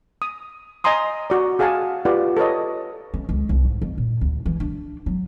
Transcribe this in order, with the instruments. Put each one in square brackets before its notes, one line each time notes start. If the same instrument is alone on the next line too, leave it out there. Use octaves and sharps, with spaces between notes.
[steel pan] D#6
D#5 G#5 A#5 C6 D#6
F#4 D5
F#4 G#4 F5 F#5 G#5 A5
F4 G4 B4 D5 F#5
A4 B4 C#5 D#5
[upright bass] C#4
C#2
C2
G#2
F2
A#2
D2
E3
D4
F#3